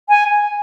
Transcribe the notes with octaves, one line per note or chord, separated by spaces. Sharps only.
G#5